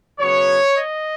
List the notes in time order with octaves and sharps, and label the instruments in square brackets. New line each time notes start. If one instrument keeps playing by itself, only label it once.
[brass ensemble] C#3 F#3 B3 C#5
D#5